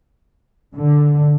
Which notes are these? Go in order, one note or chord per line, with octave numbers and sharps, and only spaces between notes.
D3